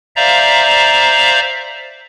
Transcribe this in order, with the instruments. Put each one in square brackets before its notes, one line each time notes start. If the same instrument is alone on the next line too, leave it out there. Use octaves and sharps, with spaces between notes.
[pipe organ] C5 D5 E5 F5 A#5